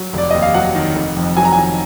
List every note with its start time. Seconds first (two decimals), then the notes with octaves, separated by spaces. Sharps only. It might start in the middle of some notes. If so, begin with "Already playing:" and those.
Already playing: F#3
0.13 F1 D5
0.31 D#2 D#5
0.42 F5
0.54 F#3 F#5
0.75 D#3
0.95 F1
1.16 F2
1.37 F#3 G#5
1.45 A#5
1.53 G#5
1.58 D#3